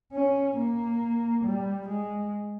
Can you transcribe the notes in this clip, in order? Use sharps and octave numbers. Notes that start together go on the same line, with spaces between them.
C#4
A#3
G3
G#3